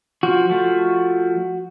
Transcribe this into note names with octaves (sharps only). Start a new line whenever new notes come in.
F3 F#4
F3 A3